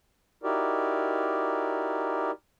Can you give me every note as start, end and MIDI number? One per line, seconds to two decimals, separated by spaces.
0.43 2.31 63
0.43 2.31 64
0.43 2.31 66
0.43 2.31 67
0.43 2.31 70
0.43 2.31 74